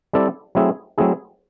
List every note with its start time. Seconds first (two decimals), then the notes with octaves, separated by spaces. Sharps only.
0.13 G3 C4 E4 A4 D5
0.55 F#3 A3 C4 E4 G#4
0.98 F#3 A3 C4 E4 G#4